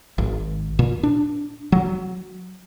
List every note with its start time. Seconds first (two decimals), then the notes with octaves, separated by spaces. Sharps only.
0.18 G#1
0.79 A#2
1.03 D4
1.72 F#3